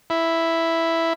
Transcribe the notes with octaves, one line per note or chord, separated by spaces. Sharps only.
E4